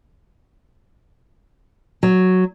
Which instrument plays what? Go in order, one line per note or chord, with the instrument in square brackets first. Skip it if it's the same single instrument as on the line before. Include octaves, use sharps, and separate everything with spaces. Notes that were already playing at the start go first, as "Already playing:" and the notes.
[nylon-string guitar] F#3